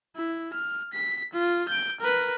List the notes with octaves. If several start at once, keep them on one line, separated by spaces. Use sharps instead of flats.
E4
F6
B6
F4
G6 D7
A#4 B4